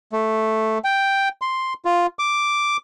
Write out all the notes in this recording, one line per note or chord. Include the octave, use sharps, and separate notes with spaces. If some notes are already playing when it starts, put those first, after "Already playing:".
A3
G5
C6
F4
D6